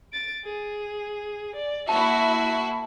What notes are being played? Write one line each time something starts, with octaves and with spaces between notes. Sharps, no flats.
A6 D7
G#4
D5
A#3 E4 F#4 E5 A5